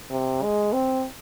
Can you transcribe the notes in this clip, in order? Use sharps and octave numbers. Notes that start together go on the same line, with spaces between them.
C3
G#3
C4